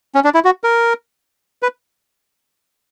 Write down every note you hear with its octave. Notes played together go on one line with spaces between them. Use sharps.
C#4
D4
E4
F#4
A#4
B4